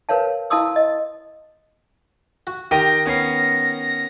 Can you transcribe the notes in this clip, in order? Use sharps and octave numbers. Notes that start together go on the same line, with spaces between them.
A#4 B4 C#5 F5 A5
E4 F5 A5 C6 D#6 E6
D#5
F#4
D#3 G4 G5 A#6 D#7
B3 C#4 C7